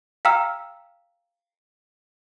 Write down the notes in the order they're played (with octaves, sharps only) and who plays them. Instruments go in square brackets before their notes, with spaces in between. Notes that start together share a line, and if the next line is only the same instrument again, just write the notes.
[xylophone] F5 G5 A#5 E6 F6